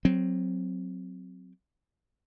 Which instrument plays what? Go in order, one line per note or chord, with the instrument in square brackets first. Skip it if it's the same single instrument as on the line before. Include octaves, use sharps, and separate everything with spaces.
[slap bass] F#3 C4